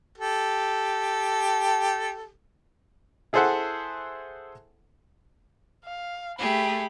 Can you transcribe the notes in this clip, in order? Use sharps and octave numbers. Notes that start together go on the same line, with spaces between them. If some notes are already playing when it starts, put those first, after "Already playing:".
G4 A4
E4 G#4 A4 C5 E5 F#5
F5
A3 G4 G#4 B5